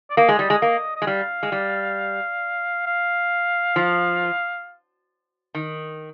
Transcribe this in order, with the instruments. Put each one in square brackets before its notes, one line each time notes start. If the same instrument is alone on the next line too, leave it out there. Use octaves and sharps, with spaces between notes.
[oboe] D5
[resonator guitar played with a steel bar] A#3 [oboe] D#5
[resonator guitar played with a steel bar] G#3
G3
G#3
A#3
[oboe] D#5
[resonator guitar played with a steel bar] G#3
[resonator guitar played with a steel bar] G3 [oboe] F5
[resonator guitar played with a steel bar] G#3
G3
[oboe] F5
[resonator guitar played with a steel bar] F3
D#3